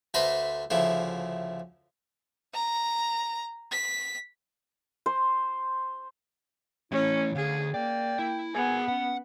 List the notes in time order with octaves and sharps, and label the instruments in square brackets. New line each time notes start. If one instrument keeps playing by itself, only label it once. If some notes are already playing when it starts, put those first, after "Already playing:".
[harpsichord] D2 A3 B4 C5 A#5 B5
D2 C#3 F3 E4
[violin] A#5
B6
[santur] C5
[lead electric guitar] E3 A3 [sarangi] C#4 [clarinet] E4
[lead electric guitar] D2 [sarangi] G#4 [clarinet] F5
[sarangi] A#3 [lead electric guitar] D5 [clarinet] G5
[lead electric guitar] E4
[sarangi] B3 [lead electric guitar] G#4 A#4 [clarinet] G#5
[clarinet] C#4 [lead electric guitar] F#5